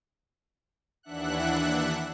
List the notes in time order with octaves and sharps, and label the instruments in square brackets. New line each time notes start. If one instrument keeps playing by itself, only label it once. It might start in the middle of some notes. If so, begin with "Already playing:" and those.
[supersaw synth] D#2 E3 D4 E5 F#5 F#6